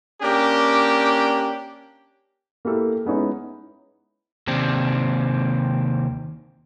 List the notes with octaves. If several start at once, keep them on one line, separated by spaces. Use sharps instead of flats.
A#3 C#4 D4 G4
A#3 E4 G4 A4
G#3 B3 C#4 D#4 E4
D#2 C3 C4 D4